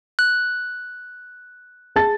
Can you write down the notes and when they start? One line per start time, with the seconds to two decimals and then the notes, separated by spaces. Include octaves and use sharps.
0.19 F#6
1.96 G#4 A5 A6